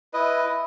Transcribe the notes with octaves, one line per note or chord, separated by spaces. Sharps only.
E4 B4 D#5
E4